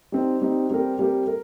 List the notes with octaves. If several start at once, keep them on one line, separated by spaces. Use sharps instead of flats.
G3 C4 D#4
G3 C4 D#4
G3 C4 G4 A#4
G3 C4 G4 A#4
A#4